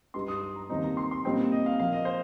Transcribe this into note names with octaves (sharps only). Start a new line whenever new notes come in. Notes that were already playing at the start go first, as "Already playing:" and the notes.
G2 G3 D#4 C6
D#6
D#6
A#5
D#2 D#3 G3 C4 D#4 A#5
A#5
C6
C6
A#2 G3 C4 D#4 G5
D#5
F5
A#2 F3 A#3 F5
D#5
C5